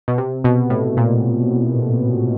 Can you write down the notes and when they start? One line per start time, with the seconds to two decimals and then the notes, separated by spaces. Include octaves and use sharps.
0.08 B2
0.18 C3
0.44 B2
0.70 A2
0.97 A#2